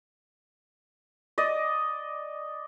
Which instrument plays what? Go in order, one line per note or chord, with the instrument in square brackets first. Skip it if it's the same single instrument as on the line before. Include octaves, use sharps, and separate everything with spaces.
[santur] D5 D#5